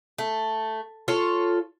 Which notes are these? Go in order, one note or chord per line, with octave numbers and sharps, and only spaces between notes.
A3
F4 A4 C#5